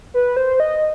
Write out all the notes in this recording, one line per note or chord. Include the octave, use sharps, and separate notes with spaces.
B4
C5
D#5